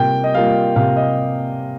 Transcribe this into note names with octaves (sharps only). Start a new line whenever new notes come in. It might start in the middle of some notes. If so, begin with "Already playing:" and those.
Already playing: C3 G3 A#3 F4 G5
D#5
G3 A#3 F4 F5
C3 F5
D#5